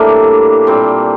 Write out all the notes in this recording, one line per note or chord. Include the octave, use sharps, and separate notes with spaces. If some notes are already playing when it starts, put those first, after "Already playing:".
Already playing: A2 G3 A#3 D4 E5
A#2 G3 C4